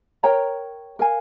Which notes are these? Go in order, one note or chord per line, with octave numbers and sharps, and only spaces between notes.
A#4 C#5 G5 A#5
A#4 F5 G#5